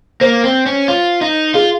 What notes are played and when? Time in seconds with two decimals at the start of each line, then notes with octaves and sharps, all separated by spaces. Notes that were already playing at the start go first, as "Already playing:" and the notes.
0.21 A#3 C5
0.44 C4
0.66 C#4
0.88 F4
1.21 D#4
1.54 F4 G#4